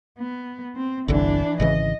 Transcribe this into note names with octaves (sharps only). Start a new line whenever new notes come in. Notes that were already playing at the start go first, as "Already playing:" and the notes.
B3
C4
G1 C2 D3 E3 D4
G#1 C#3 E3 D#5